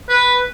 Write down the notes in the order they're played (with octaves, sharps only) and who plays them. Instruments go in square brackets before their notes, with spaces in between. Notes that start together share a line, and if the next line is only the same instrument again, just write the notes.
[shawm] B4